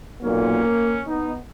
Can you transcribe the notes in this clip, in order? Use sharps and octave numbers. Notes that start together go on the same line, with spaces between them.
B1 A#2 A#3 C#4
B3 D#4